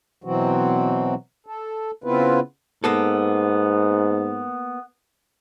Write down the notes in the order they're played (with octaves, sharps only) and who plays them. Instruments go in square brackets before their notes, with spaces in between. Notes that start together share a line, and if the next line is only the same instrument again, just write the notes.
[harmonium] B2 E3 F#3 C4 F#4
A4
C#3 B3 C4 E4 F4 B4
[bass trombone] G#2 [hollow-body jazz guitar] A#3 B3 A4